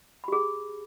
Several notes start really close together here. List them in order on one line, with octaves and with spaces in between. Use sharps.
B5 G4 G#4